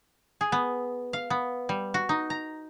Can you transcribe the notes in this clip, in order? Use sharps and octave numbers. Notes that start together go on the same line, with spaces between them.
G#4
B3
F5
B3
G3
F#4
D#4
A#5